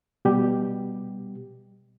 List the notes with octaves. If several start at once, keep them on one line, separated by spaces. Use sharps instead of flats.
B2 G3 G4